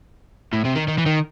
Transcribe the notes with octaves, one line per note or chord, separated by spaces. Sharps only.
A2
C3
D#3
D#3
E3
D#3